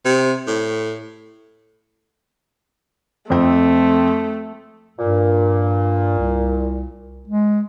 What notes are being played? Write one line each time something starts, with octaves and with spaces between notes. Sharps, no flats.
C3
A2
F2 A3 C4
G2 A#2
C2
G#3